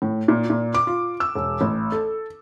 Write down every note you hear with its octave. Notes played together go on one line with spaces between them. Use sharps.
A2
A#2
A#2
D6
F4
E6
E1
A1
A4